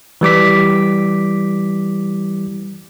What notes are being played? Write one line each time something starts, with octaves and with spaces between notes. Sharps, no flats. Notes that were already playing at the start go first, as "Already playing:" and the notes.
E3 G3 D6 B6